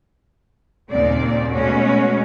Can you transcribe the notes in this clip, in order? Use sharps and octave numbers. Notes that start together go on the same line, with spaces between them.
D#2 A#2 C#3 C4 D5
B2 G#3 A3 C#4 F#4